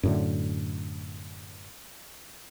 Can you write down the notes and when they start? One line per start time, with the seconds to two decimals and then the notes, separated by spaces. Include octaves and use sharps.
0.03 F#2 A2 D3